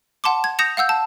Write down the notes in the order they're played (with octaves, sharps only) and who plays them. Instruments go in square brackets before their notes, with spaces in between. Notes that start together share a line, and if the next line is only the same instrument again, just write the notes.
[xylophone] F#5 A5 C6 D6
G#6
D#6 G6 A#6 C#7 E7 F7
F5 F#5 E6 G6
A5